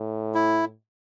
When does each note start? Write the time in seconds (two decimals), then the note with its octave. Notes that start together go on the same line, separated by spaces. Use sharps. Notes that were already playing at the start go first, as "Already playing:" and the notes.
Already playing: A2
0.35 E4